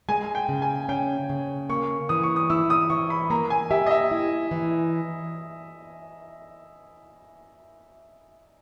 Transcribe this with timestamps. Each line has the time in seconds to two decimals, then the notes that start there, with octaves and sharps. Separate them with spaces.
0.09 G#3 G#5
0.35 G5
0.49 C#3
0.62 G#5
0.89 C#4 G5
1.30 C#3
1.70 A#3 C#6
2.09 E3 D#6
2.23 C#6
2.36 D#6
2.50 E4 E6
2.70 D#6
2.90 E3 C#6
3.10 B5
3.30 A#3 A#5
3.50 G#5
3.71 G4 E5
3.86 D#5
3.91 E5
4.11 E4
4.51 E3